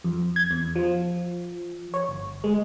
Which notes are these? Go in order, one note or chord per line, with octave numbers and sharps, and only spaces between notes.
F2
G#6
E2
F3
C#5
G1
G#3